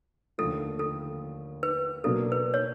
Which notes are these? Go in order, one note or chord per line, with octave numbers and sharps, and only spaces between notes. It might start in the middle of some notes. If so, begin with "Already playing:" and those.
D#2 D3 F3 A3 A4
A4
B4
B2 F#3 A#3 D4 A4
B4
C#5